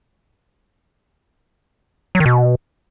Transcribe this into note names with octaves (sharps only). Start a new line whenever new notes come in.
F#3
D#3
B2